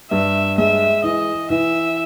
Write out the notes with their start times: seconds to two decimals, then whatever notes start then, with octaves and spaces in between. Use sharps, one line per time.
0.11 G2 E5
0.58 G#3 E5
1.03 E3 D#5
1.50 E3 E5